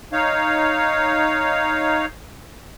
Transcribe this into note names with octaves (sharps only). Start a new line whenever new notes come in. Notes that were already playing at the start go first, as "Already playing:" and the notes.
D#4 C#5 F5